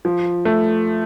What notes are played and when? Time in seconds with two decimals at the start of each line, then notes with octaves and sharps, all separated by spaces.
0.05 F3
0.45 A3